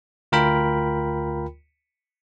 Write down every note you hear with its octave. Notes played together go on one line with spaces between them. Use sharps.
D2 F4 A#4 G5 B5